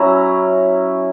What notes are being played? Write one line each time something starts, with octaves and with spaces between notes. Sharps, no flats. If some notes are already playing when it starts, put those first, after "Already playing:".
Already playing: F#3 C#4 E4 A#5